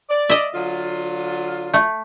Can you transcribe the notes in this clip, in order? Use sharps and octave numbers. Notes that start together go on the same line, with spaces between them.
D5
D#5 E5
D3 F#3 F4
A3